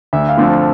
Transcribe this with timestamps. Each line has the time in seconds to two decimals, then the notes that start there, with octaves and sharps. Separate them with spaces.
0.13 D2 E5
0.29 F5
0.37 D3 F3 A3 C4